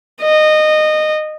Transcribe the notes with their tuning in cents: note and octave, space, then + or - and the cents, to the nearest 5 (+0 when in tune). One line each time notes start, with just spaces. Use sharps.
D#5 -20